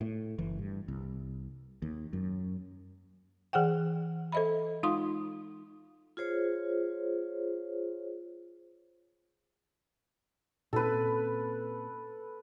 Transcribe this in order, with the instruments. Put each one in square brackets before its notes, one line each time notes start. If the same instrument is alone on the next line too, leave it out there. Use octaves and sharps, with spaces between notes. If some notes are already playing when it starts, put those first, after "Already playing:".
[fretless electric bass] A2
F#1 E3
G2
C2
D#2
F#2
[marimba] E3 G#4 C5 F#5 G5
A4 C5 D#5 E5 B5
G#3 D#4 F4 F5 C6 D#6
[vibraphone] F4 G#4 C5 C#5
[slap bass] A#2 C4 C#4 [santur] A4 B4